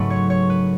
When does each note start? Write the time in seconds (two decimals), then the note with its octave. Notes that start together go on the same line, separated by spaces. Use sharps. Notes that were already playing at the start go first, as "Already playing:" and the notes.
Already playing: G#2 C#3 F#3 A3 B4
0.10 C#5
0.30 C#5
0.50 B4